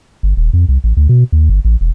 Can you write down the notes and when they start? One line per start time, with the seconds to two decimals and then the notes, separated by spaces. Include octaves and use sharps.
0.23 G1
0.37 D#1
0.53 F2
0.69 C2
0.84 A1
0.97 D2
1.09 B2
1.32 D#2
1.50 G1
1.65 A1
1.81 E1